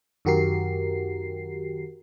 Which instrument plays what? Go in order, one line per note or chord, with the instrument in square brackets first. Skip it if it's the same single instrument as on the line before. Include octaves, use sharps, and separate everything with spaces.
[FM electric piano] F#2 D#3 F#4 G4 A#4 C7